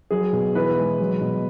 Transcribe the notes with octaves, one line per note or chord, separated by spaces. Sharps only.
F#3 G#4
B2
E3 B4
G#3
F#3
B2